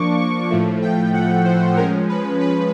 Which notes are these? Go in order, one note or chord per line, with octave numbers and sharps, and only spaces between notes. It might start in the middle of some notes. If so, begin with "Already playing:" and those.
Already playing: F3 A#3 D4 C#6 D6
C#6
A2 F3 A3
G5
F#5
C5
F3 G#3 C#4 A#4
B4
B4